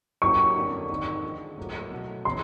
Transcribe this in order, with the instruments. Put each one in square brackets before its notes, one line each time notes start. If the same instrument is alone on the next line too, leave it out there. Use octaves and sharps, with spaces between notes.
[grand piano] F#3 A#3 C#4 E4 G4 [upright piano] C#6
[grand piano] F2 D3 G3 A#3 D4
G#2 D#3 G3 C4
D3 F3 G#3
A2 F#3 A#3
B2 F#3 A3
[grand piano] C#3 E3 [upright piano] C6